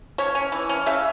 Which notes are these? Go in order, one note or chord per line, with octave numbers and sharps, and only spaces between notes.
C#4 C#5
C#4
E3
C#4
C#3 E5